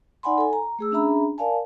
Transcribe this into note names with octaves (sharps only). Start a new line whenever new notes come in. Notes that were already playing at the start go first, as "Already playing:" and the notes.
D#4 D5 F#5 G#5 B5 C6
A4 G#5
A#5
A3 G#4 E6
C#4 D4 G#4 E5 A#5 B5
A#4 D5 F5 G#5 A5